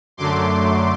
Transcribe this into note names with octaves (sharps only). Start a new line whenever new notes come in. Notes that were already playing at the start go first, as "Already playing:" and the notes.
F#2 D3 F#3 A3 C6 D6